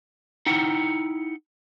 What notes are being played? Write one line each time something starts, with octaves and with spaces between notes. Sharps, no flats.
D#4 E4 F#5 G5